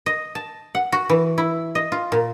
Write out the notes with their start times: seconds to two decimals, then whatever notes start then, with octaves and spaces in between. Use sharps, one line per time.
0.06 D#5
0.35 A5
0.75 F#5
0.92 F#4
1.09 E3
1.38 E4
1.75 D#5
1.92 F4
2.12 A#2